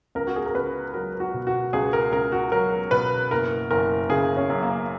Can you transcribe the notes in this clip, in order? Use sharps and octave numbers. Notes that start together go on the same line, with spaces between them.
C#2 A#4
F#4
G#4
A#4
C#2 B4
F#3 A#4
F#4
B2
F#4
C#2 G#4
A#4
C#2 A#4
F#4
F#3 A#4
B2 B4
F#1 A#4
F#1 A#4
C#3 G#4
C#4
F#2
A#3